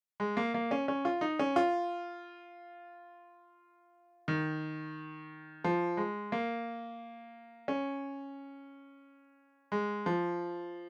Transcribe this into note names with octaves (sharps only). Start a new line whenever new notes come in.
G#3
A#3
A#3
C#4
C#4
F4
D#4
C#4
F4
D#3
F3
G#3
A#3
C#4
G#3
F3